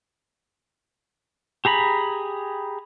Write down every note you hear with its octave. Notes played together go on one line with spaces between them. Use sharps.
G4 G#4 A#5 B5